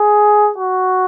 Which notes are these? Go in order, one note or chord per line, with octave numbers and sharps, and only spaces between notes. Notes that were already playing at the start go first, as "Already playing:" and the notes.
Already playing: G#4
F#4